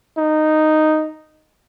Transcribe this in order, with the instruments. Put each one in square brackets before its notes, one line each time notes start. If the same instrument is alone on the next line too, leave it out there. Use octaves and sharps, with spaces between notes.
[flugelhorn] D#4